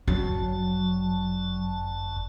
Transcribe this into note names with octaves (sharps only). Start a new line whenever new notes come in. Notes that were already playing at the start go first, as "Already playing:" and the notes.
G1 F#2 F#3 A5